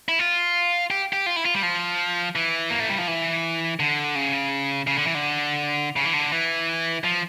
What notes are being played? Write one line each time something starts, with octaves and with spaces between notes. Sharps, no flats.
E4
F4
G4
G4
F4
E4
F4
G3
F3
E3
A#3
A3
G3
F3
E3
D3
C#3
C#3
D3
E3
D3
C#3
E3
D3
E3
F3